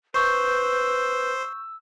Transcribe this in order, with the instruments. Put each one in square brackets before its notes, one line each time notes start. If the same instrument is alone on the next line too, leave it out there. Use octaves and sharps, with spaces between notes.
[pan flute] B4 [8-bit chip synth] C5 [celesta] C#6 G6 [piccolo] E6